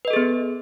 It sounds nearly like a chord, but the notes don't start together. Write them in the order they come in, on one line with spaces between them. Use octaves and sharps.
B4 D#5 A4 G#4 B3